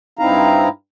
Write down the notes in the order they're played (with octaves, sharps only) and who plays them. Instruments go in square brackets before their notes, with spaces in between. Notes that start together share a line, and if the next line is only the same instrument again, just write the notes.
[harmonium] G2 C4 D#4 E4 F5 A#5